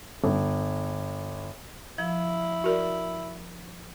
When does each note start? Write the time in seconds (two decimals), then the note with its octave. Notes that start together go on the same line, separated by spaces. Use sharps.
0.24 G1
1.98 F3 E4
2.64 F#4 A#4 D5